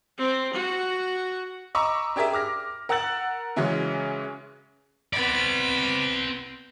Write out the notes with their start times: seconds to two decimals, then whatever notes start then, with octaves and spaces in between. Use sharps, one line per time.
0.18 C4
0.54 F#4
1.75 D#5 A#5 B5 C#6 D6 E6
2.16 D4 G4 G#4 A#4 E5
2.33 D6 F6 A#6
2.89 A#4 F#5 E6 F#6 A6 F#7
3.56 C#3 E3 F#3 G#3 C#4
5.13 B3 C4 D5 B5